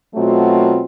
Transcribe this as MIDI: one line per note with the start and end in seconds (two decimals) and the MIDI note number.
0.16 0.85 47
0.16 0.85 54
0.16 0.85 57
0.16 0.85 60
0.16 0.85 65
0.16 0.85 66